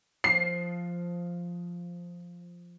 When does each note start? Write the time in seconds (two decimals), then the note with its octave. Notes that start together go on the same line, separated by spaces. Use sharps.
0.24 F3 C7